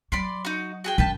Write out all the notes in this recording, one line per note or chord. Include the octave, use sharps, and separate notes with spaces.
F#3 D5 B5 C6
D#4 F#4
F#4 G#4 G5
F#2 B4 G5 A5